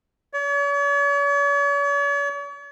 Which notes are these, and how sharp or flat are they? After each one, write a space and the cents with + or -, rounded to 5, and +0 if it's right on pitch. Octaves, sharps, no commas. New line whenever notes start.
C#5 +45